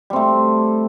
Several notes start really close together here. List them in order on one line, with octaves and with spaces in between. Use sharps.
G3 C4 A3